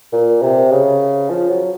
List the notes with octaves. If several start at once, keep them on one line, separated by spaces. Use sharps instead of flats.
A#2
C3
C#3
F3
F#3